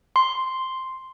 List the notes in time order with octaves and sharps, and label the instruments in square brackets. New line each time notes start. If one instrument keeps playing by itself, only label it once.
[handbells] C6